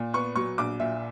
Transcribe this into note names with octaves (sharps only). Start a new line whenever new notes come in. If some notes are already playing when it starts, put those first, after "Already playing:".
Already playing: A#2
B3 C#6
F#3 C#6
A#1 D6
A#2 E5